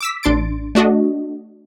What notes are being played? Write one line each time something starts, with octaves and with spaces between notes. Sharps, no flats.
D6 E6 B6
A1 D4 C6 A6 D7
A3 D4 F#4 D#5